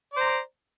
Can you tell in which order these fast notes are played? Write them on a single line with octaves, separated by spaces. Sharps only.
D5 C5 A#5